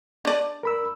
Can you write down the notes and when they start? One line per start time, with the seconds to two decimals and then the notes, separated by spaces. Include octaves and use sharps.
0.25 D4 D5
0.63 A#4 B5 E6